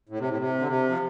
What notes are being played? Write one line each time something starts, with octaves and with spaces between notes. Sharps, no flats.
A2
C3
A2
C3
D3
C3
F3